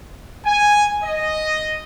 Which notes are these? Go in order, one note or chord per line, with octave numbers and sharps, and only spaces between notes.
G#5
D#5